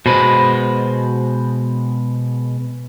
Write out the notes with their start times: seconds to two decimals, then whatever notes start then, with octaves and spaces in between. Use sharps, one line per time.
0.06 B2 G#3 F#4 C5 B5